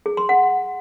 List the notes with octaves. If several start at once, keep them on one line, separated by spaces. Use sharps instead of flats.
G#4
C6
F#5